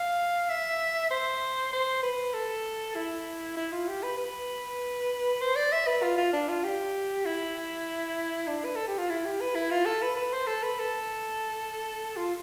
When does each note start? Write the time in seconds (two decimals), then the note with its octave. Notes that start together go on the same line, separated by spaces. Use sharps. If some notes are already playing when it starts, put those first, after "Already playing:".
Already playing: F5
0.49 E5
1.10 C5
1.73 C5
2.03 B4
2.34 A4
2.96 E4
3.57 E4
3.72 F4
3.88 G4
4.03 B4
4.18 B4
5.41 C5
5.56 D5
5.72 E5
5.87 B4
6.02 F4
6.17 F4
6.33 D4
6.48 F4
6.64 G4
7.25 E4
8.47 D4
8.65 B4
8.75 A4
8.88 G4
8.98 F4
9.10 E4
9.25 G4
9.41 B4
9.55 E4
9.71 F4
9.86 A4
10.02 B4
10.16 B4
10.33 C5
10.47 A4
10.63 B4
10.79 A4
12.17 F4